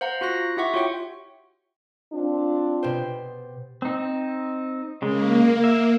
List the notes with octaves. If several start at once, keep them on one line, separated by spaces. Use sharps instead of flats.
C5 F5 F#5 A#5
F4 F#4 F#6 A#6
E4 G4 E5 F#5 C#6
F4 F#4 C#5 G5 C#6
C4 D4 F4
B2 G4 C5
C4 D#4
C#3 G#3 A#3
E5